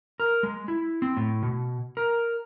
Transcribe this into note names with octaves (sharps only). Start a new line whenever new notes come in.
A#4
G#3
E4
C4
A2
B2
A#4